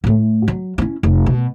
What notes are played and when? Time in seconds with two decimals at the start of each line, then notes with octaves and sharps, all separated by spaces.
0.04 A2 A3
0.48 F#3
0.78 C#4 E4
1.03 F1
1.26 B2